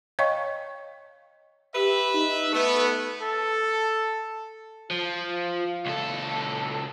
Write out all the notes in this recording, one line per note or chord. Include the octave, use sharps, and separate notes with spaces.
C#5 D#5 F5 G5 C#6
G4 B4 E5
D#4
A3 B3 B4
A4
F3 F4
C#2 A4